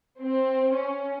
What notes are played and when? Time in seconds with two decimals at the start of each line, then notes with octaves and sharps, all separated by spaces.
0.20 C4
0.75 C#4